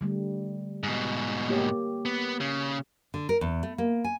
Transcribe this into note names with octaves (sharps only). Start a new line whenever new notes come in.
D3 G3 A3
G#2 B2
A#3 G4 C#5
B3
C#3
D3
A#4
E2
A3
A#3
G#5